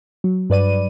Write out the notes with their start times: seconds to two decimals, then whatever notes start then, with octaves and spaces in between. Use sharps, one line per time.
0.24 F#3
0.50 G2 B4 D5 D#7